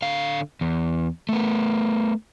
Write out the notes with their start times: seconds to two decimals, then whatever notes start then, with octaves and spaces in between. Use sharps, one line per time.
0.02 D3 F5
0.61 E2
1.29 A3 B3